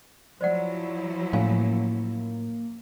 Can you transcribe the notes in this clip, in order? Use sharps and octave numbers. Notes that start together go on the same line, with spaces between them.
F3 F#3 E4 C5 D5 F#5
A2 A#3 C#4 F5 G#5